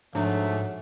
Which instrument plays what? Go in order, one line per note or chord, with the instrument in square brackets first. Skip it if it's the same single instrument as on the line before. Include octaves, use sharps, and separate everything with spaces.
[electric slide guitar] G#2 [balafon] F3 D4 [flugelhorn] A3 [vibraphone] F#4 C#5 F#5